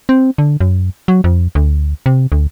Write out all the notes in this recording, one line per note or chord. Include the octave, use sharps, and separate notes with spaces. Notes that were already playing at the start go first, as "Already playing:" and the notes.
C4
D3
F#2
F#3
F2
D2
C3
D2